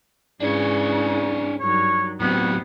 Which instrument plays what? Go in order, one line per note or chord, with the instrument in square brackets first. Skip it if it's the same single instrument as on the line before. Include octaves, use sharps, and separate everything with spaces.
[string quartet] G#2 C#3 E3 [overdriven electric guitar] D4 C#5
[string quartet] G2 D#3 F#3 [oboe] C#5
[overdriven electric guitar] A2 F#3 [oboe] B3 [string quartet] C4 D#4 G4